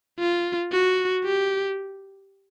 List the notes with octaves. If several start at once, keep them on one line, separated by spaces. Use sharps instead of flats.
F4
F#4
G4